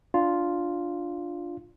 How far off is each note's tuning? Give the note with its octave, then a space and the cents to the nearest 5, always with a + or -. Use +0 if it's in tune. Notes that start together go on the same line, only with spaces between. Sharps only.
D4 +0 F4 +0